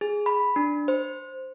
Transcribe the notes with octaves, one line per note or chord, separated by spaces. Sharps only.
G#4
B5
D4
C5